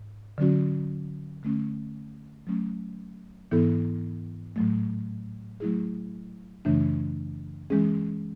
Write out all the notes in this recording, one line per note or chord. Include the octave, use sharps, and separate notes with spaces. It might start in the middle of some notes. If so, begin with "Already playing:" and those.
Already playing: G#2
D3 F#3 C#4 F#4
D3 A3 C#4
F#3 A3 C#4
G#2 E3 B3 E4 A4
A2 F#3 A3
F#3 A3 E4 G#4
F#2 C#3 E3 A3 D4
E3 G#3 C#4 G#4